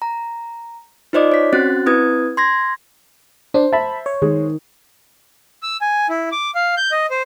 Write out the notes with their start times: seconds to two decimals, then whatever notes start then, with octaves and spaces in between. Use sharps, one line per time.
0.02 A#5
1.13 D#4 F4 C5 D5 D#5 D6
1.32 C#5 B6
1.53 C4 C#4 F#4 C5 F#6 A6
1.86 C4 E4 B4 D#6 G#6
2.37 C6 G#6 A#6
3.54 D4 C5
3.72 E5 A5 B5
4.06 C#5
4.22 D#3 G#3
5.63 E6
5.81 G#5
6.10 E4
6.32 D6
6.55 F5
6.77 G6
6.92 D#5
7.10 C5